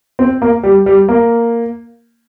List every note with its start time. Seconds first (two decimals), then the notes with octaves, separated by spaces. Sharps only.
0.19 C4
0.42 A#3
0.63 G3
0.86 G3
1.09 A#3